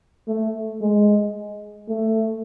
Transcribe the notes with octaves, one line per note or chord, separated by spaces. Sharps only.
A3
G#3
A3